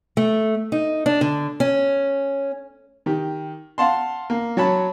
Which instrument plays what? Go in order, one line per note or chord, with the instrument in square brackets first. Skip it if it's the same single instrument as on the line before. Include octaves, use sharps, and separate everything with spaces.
[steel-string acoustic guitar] A3
D#4
D4
D3
C#4
[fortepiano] D#3 G4
F5 F#5 A5 C6
A#3
F#3 C#5 A5 B5